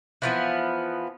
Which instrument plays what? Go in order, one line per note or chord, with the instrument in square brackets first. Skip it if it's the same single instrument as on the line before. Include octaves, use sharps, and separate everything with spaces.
[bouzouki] E3 F3 B3